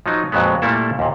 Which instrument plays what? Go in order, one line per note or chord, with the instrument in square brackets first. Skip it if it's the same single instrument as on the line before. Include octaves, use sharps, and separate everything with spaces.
[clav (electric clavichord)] F3 F#3 D#4
F2 A#2 F#3 G#3 B3
A#2 G3 A3 A#3 E4 A4
D#2 A#2